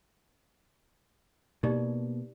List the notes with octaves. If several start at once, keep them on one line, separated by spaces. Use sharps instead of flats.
B2 A#3 D#4 G4 D5